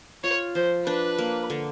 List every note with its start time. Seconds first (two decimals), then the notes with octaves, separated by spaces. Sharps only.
0.24 F4 C#5
0.55 F3 C5
0.87 D4 B4
1.18 A#3
1.50 D3